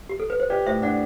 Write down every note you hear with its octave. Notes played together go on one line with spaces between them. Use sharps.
G4
A4
B4
C5
G4 B4 D5
A2 C5 E5
D4 D5 F#5